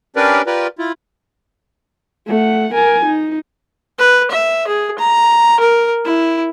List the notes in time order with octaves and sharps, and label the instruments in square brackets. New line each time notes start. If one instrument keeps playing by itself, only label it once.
[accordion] C#4 D4 G4 A#4 B4 D5
F4 G4 A#4 B4 D5
E4 F4
[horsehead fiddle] A3 F#5
A#4 G#5
D#4
[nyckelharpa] B4
E5
G#4
A#5
A#4
E4